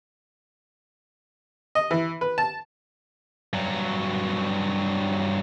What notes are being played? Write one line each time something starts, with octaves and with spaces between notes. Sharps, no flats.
D#5
E3
B4
A5
G2 F#3